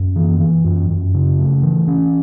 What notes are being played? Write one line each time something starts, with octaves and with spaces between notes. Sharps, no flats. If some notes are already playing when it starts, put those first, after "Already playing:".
Already playing: F#2
E3
E3
F#2
F#2
C#3
A3
E3
C#4